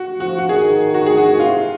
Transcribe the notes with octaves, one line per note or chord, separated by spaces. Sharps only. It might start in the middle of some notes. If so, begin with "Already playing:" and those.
Already playing: F#4
F3 F#4
F#4
D#3 G#4
F#4
G#4
F#4
C3 F4